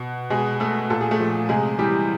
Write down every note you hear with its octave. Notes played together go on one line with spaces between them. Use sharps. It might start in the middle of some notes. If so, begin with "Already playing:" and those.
Already playing: B2
B2 G#3 G#4
A3 A4
A#2 A4
G#4
A3 A4
F3
C3 G#3 G#4
E3 G3 G4